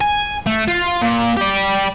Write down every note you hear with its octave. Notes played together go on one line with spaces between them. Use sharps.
G#5
A3
F4
A#2
G4 D5